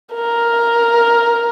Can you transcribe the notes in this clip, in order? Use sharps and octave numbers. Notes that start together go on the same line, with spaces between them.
A#4